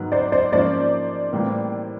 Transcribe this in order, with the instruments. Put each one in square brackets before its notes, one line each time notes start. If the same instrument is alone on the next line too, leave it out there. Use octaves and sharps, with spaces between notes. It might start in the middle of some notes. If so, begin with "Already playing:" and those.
Already playing: [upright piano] G#2 D#3 F#3 B3
[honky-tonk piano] C5 D5
C5 D5
[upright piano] G#2 F3 A#3 C#4 [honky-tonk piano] C5 D5
[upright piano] A2 E3 G3 A#3